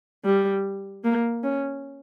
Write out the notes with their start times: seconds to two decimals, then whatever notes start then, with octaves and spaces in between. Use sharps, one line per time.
0.25 G3
1.04 A#3
1.43 C#4